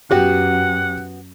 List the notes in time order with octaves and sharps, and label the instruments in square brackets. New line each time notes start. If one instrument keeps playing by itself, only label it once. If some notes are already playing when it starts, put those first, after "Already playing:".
[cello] F#2 [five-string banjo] B3 F#4 [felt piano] G4 [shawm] F#5